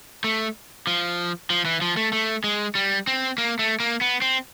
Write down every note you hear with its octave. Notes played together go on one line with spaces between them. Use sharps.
A3
F3
F3
E3
F3
A3
A3
G#3
G3
C4
A#3
A3
A#3
B3
C4